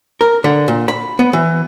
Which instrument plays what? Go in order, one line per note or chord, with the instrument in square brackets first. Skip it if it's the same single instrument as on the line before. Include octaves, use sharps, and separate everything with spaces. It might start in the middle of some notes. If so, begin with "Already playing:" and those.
[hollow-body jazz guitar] A#4
D3
A#2
B5
B3
E3